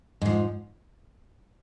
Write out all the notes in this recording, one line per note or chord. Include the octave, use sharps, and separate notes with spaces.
G#2 F3